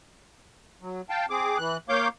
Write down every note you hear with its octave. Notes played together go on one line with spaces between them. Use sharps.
F#3
F5 G5 A5
C4 G#4 D6
E3 F#6
A#3 C#5 F5 D6 G6